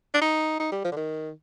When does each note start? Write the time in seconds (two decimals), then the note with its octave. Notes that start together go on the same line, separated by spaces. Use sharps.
0.14 D4
0.22 D#4
0.60 D#4
0.72 G3
0.84 F3
0.92 D3
0.97 D#3